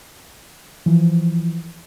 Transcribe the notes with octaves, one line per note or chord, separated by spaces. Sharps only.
E3 F3